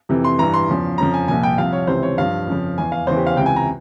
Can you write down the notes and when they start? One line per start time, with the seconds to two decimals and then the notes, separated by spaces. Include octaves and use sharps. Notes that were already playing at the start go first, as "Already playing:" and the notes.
0.09 F2 C3 E3
0.24 C6
0.38 G2 E3 A#5
0.54 C6
0.68 E2 C#3 F3
0.98 F2 C#3 F3 A#5
1.14 G#5
1.28 C2 A#2 F3 G#5
1.43 G5
1.58 C2 C3 F3 F5
1.73 C#5
1.87 C#2 C3 E3 C5
2.03 C#5
2.17 G2 F3 F5
2.47 F2 C#3 F3
2.78 E2 E3 G#5
2.92 F5
3.07 E2 C#3 E3 C5
3.17 G4
3.27 F5
3.36 C#2 C3 E3 G5
3.46 G#5
3.56 A#5